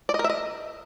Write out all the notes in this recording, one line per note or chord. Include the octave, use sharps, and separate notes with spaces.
D5
D#5
A#4
E5
D#5